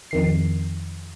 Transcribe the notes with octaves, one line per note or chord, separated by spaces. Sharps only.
F2 D#3 C7